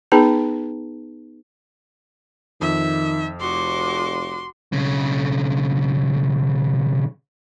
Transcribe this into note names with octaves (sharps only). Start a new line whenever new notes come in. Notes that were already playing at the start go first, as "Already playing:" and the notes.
B3 D#4 G#4 B4 A5 A#5
F2 D#3 E5
F1 F#4 C6 D6
B1 C#3